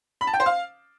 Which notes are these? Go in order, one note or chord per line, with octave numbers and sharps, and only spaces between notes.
B5
A5
G5
C5
F5